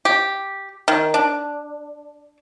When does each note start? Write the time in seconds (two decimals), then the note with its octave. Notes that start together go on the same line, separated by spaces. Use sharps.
0.05 G4
0.88 D#3
1.14 D4